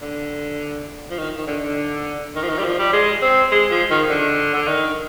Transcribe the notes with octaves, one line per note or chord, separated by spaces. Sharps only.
D3
F3
D#3
D#3
D3
D3
D#3
F3
D#3
G3
F3
G3
G#3
C4
G#3
F3
D#3
D3
D3
D#3